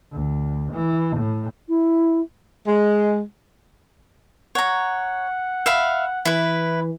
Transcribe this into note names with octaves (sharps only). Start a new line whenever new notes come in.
D2
E3
A2
E4
G#3
C#5 F#5 A#5
E5 F5 B5
E3 E4 B4